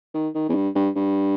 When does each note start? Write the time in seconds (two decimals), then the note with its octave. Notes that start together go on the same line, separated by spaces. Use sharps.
0.14 D#3
0.35 D#3
0.49 E2
0.55 G2
0.75 G2
0.96 G2